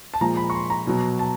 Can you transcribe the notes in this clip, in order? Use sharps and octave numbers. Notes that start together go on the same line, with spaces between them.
A5
A#2 F3 G#3 A#5
B5
C#6
C6
A#5
B2 F#3
A5